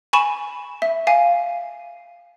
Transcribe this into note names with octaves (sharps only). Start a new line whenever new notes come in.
G#5 B5 C#6 E7
E5
F5 G#5